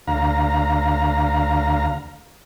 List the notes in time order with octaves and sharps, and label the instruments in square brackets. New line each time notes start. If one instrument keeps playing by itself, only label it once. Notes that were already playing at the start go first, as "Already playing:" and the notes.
[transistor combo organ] D2 F5 A#5